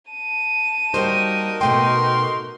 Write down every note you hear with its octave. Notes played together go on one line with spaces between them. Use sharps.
A5 D#7
G3 A#3 D#4 F#4 A#4 C5
B2 A3 G5 C6